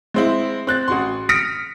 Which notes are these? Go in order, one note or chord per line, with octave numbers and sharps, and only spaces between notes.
G#3 C4 E4
C4 F#6 A6
A1 F#4 C6
D#6 F6 A#6 B6 C#7 D7